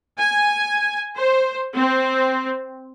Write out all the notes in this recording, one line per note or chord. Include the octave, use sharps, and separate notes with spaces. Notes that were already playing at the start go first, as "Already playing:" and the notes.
G#5
C5
C4